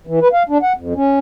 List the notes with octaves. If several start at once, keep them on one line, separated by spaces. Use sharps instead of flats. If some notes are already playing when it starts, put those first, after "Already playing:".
E3
B4
F5
D4
F#5
F2
C#4